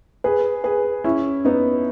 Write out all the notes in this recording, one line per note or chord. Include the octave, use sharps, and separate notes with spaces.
G#4 B4
G#4 B4
C#4 E4
B3 D#4